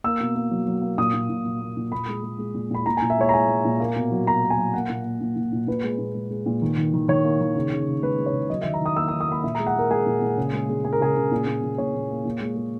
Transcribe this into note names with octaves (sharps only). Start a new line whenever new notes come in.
A#3 E6
B2
A#3
F#3
F#3
A#3
A#2 D#6
A#2
A#2
A#2
A#3
A#2
A#2 B5
G#3
G#3
G#3
A#2
A#2 B5
A#2 A#5
A#2 G#5
E5
G#3 C#5
A#5
G#3 G#5
G#3
A#2
A#3
B2
F#3
B2 A#5
A#3
G#5
F#3
A#3 F#5
A#2
A#3
A#2
A#2
A#2
A#2 B4
G#3
A#2
G#3
G#3
A#2
D#3
D#3
D#3
D#3 C#5
A#3
D#3
C#3
C#3
C#3
G#3 B4
G#3
C#5
C#3
F#3 D#5
D#3 E5
A#5
D#3 D#6
A#3 E6
D#6
D#3
D#6
A#3 B5
A#2 E5
G#3 A#5
F#5
G#3 A#4
G#3 G#4
A#2
A#2
C#3
G#3
G#3
G#3 G#4
A#4
C#3 G#4
C#3
A#2
A#2
A#2
A#2 C#5
A#2
A#3
A#2
G#3
G#3